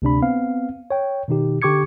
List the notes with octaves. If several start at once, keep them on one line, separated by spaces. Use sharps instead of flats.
D2 C3 D4 B5
B3 C4 F5
C#5 G5
B2 D#3 D#4 G4
D3 G4 C#6 D6 G#6 C#7